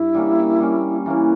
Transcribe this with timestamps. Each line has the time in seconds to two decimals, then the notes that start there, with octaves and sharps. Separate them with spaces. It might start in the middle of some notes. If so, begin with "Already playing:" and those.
Already playing: G2 E4
0.15 G3 A#3 C#4
0.60 G3 A#3 C#4
1.06 E3 A#3 C#4